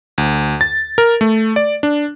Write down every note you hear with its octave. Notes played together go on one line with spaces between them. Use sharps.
D2
A6
A#4
A3
D5
D4